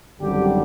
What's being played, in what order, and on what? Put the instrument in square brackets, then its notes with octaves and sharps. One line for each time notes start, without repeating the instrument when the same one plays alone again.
[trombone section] G#1 F#2 D3 G3 G4